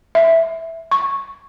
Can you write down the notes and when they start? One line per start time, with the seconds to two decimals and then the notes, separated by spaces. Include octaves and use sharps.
0.15 E5
0.91 C#6